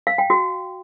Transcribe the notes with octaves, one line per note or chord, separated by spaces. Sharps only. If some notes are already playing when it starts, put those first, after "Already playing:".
F5
G5
F#4